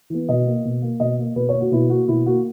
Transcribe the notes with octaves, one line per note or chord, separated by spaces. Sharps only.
E3 B3
B2 D#5
A#3
B2
A#3
B2 D#5
A#3
B2 B4
C#5
A#3
F#4
B2 E4
A#3 F#4
B2 E4
A#3 F#4